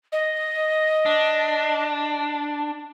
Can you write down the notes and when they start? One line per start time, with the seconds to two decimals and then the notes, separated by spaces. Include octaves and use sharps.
0.12 D#5
1.06 D4